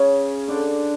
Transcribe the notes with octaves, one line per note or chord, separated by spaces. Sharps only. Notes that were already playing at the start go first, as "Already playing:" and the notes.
Already playing: C#3 C#4
D3 D4